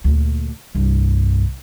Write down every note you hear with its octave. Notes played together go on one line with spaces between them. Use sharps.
D2 A#2
C2 G2